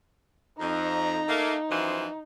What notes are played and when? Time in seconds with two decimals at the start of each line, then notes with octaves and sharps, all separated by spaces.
0.60 F2 D#4 A#5
1.29 A3 A#3
1.70 F#2 E3 F3 C5